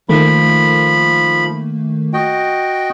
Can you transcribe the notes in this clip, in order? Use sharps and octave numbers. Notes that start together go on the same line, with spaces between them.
D#3 F3 A3 A#3 B5
F#4 D#5 G5